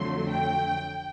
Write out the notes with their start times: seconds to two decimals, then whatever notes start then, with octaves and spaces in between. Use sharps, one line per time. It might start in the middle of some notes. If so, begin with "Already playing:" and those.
Already playing: F2 D3 F#3 A3 C6
0.29 G5